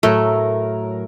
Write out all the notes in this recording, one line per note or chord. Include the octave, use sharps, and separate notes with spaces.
A2 F#3 A3 A#4